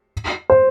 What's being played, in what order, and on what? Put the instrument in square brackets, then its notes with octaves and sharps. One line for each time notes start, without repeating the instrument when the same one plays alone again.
[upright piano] C5